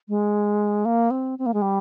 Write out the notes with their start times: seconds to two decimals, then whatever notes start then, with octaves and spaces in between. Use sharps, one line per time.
0.09 G#3
0.85 A#3
1.11 C4
1.39 C4
1.46 A#3
1.54 G#3
1.62 G3